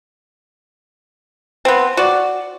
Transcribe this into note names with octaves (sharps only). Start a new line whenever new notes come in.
B3 C4
F#4 D5